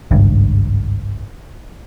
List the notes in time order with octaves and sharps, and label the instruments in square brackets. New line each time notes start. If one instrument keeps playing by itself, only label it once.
[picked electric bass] G#1 C#2 G2